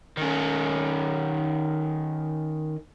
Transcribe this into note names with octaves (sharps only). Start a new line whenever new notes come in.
D#3 C#4